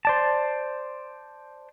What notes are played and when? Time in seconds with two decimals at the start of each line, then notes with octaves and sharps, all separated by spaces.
0.05 C5 D5 A5